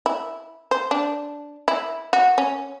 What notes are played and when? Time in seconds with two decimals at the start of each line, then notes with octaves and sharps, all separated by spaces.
0.06 E4
0.71 C5
0.91 D4
1.68 E4
2.13 F#4
2.38 C#4